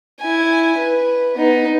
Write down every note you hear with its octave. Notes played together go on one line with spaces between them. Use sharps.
E4 G#5
B4
B3 D#4